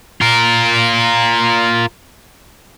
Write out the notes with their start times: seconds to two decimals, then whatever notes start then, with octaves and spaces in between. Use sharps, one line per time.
0.21 F4 A#4